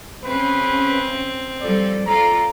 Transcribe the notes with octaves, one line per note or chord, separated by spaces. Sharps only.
C#3 C4 C#4 B4
F3 G3 A4 D5
F4 A4 D5 A#5